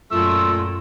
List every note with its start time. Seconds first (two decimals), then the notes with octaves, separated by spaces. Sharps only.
0.12 F#2 A#2 A3 F4 E6